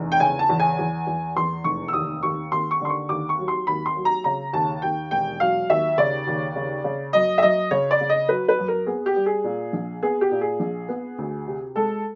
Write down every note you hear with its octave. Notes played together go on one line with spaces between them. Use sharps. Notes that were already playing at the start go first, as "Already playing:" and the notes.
Already playing: F1 E2
G5
C#3 G#5
A5
E2
G#5
E2
E2
E2 C6
F1 C#6
E6
D#2 D#6
D#2 C#6
D#2 C6
C#6
D3 C6
C#6
D#2 D6
C#6
F#3
C6
D#2 B5
C6
F#3
A#5
C#3 A#5
D#2 A5
D#2 G5
E1 G5
F#3 F5
D#2 E5
C#3 D5
D#2
C#3
C#3
F#2 D#5
E5
F#2 D#5
C#3 C#5
D5
C#3
D#5
F#3 B4
B4
F#2
A#4
B3 G#4
G4
G3
G#4
A#2
A#1
B3 G#4
G4
A#2
G#4
A#1
B3
D2
C3
G#3 A4